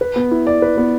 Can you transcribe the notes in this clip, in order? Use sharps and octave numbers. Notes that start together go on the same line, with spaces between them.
B4
B3
E4
D5
B4
B3